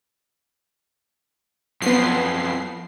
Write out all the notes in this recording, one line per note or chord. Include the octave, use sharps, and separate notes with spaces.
F#2 F3 B3 C7